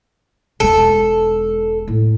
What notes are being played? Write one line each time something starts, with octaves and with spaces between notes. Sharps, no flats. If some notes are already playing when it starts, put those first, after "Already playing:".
E1 G#3 A4
A2